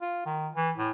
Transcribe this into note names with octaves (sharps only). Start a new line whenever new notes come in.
F4
D#3
E3
A2